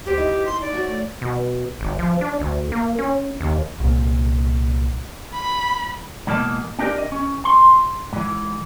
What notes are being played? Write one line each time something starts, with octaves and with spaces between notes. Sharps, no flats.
D2 G4 C5
D#4 E4 D#5
C6
D#4 D5
A3 F#4 C#5
B2
G#1
F3
D4
D2
A#3
C#4
D#2
C2 A#2
B5
G#2 B2 E3 A#3 D#5 A5
C4 D4 D#4 G4 A#4 D5
D#5
C#4
C6
G#2 E3